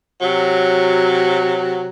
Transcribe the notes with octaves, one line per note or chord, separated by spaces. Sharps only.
C3 F#3